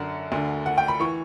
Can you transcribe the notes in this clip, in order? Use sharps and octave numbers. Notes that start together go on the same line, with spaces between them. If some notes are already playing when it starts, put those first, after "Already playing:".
Already playing: F#2 D3 F#5
D2 D3
F#5
G5
B5
E3 C#6